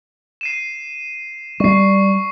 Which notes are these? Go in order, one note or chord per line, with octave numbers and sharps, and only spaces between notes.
C7 D#7 E7
G3 C#6 C7